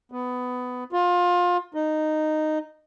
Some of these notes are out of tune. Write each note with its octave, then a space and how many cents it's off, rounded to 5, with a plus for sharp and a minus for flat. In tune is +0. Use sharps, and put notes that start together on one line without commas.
B3 +15
F4 +25
D#4 -10